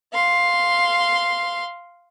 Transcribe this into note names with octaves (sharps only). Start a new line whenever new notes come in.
F5 C6